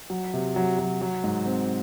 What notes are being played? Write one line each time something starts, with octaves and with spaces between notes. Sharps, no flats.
F#3
C3
F#3
F#3
F#3
G#2
C4